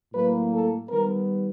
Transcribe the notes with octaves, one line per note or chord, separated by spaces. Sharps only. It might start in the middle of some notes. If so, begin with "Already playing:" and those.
A2 F#3 A#3 B4
A4
D#3 G3 B3 A#4